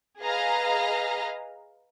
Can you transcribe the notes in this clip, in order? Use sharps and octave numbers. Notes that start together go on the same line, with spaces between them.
G#4 B4 D#5 F5 A#5